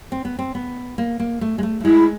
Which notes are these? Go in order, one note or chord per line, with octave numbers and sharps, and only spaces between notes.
C4
B3
C4
B3
A#3
A#3
A3
G#3
A3
A3
G#3 E4